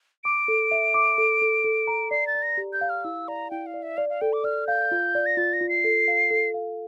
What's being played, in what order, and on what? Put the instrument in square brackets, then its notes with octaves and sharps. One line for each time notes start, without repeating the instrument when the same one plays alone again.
[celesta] D6 [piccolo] D7
[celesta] A4
E5
D6
A4
A4
A4
A#5
[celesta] D5 [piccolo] C7
[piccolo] A6
[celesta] D5
[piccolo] A#6
[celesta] G4
[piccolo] G6
[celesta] F5
[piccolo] F6
[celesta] E4 [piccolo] E6
[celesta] D5 [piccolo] A#5
[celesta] E4 [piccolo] G5
[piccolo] F5
[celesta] D5
[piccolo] E5
[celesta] D5 [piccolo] F5
[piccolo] F5
[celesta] A4 [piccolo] G5
[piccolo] D6
[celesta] D5 [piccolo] F6
[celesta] F5 [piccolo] G6
[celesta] F4
D5
[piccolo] A#6
[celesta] F4 [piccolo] A6
[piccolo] A#6
[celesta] F4
[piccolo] C7
[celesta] A4
F5
A4
F5